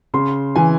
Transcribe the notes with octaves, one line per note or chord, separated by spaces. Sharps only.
C#3 C6
E3 G#5